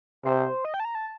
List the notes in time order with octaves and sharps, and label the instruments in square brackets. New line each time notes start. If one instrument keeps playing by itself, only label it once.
[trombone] C3 [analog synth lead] C5
[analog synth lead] D#5
G5
A5
A#5
A5